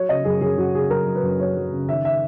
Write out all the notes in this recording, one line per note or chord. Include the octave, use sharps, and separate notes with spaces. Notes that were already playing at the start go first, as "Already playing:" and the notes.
Already playing: F#3 C#5
C#3 D#5
F#2 G#4
F#2 G#4
F#2 F#4
C#3 G#4
F#2 A#4
F#3
B4
F#2
F#3 C#5
F#3
C#3
D#3 E5
E5